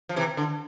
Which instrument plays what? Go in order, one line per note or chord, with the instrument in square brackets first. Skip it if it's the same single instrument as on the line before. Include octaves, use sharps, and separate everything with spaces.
[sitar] F3
C3 E3
D3